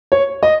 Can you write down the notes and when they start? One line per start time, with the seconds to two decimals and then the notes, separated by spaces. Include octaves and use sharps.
0.12 C#5
0.43 D#5